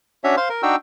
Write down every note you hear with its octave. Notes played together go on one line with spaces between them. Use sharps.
C#4 D4 F#4 C#5 E5
C5 F5 C6
A#4
D4 D#4 F#4 G5 E6